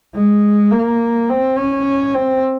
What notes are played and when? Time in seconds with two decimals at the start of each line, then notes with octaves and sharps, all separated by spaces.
0.15 G#3
0.71 A#3
1.29 C4
1.58 C#4
2.15 C4